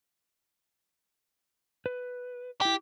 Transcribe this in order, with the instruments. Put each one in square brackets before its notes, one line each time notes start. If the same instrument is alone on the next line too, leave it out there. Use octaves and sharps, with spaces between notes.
[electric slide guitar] B4
[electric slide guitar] E4 G5 [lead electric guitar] G4